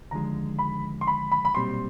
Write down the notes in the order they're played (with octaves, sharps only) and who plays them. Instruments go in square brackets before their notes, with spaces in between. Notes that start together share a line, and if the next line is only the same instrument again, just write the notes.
[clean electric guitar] D#2 D3 F3 G#3 [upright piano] A#5
[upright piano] B5
C6
B5
B5
B5
[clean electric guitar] B1 A#2 G3 C4 [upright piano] C6